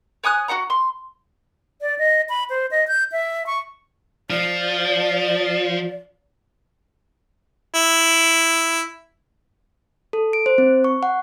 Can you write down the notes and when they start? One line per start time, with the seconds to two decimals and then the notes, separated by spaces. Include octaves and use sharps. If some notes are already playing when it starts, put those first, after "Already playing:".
0.24 C#5 G#5 D#6 F#6
0.48 F#4 D#5 F#5 A#5
0.70 C6
1.81 D5
1.99 D#5
2.29 B5
2.50 C5
2.71 D#5
2.87 G6
3.12 E5
3.46 C#6
4.30 F3 D5
7.75 E4
10.13 A4
10.33 D7
10.46 C5
10.58 C4
10.84 C#6
11.03 F#5